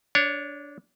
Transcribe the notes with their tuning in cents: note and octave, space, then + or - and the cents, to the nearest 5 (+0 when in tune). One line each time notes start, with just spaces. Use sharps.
D4 -15 C#5 +5